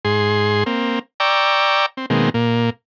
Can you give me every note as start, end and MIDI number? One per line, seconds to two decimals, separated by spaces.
0.05 0.64 44
0.05 0.64 68
0.05 0.64 84
0.66 0.99 58
0.66 0.99 60
1.20 1.86 74
1.20 1.86 79
1.20 1.86 82
1.20 1.86 85
1.20 1.86 86
1.20 1.86 88
1.97 2.06 60
2.10 2.30 47
2.10 2.30 51
2.10 2.30 56
2.10 2.30 58
2.10 2.30 60
2.34 2.70 46
2.34 2.70 58